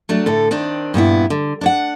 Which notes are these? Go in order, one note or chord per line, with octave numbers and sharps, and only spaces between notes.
F#3 A3 D4
A2 D3 A4
D#3 C4 D4
G2 A#2 B3 E4
D3
D4 C#5 F#5